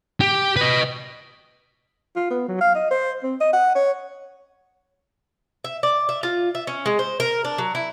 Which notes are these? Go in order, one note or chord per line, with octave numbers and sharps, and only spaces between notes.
G4
B4 D#5
F4
B3
F#3
F5
D#5
C5
C4
D#5
F#5
C#5
E5
D5
E5
F4
E5
C#4
G#3
C5
A#4
D4
F#3
E4